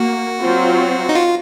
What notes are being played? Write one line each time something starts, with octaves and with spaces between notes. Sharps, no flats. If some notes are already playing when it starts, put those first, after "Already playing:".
Already playing: A#3 F#4
F#3 C4 F4
D#4
F4